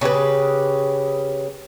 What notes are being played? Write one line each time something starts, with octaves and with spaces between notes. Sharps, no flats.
C#3 D4 G4 B4